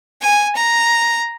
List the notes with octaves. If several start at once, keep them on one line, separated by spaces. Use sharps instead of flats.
G#5
A#5